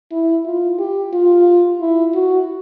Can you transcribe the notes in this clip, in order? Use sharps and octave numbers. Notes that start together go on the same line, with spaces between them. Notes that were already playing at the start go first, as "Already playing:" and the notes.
E4
F4
G4
F4
E4
F#4